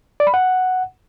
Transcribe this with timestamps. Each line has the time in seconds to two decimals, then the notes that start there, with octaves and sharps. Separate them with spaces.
0.20 D5
0.27 B5
0.34 F#5